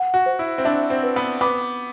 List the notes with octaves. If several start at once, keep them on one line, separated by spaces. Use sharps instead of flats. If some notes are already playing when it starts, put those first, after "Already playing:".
Already playing: F#5
F#4
C5
E4
C4
D4 E5
C4
B4
B3
B3 D6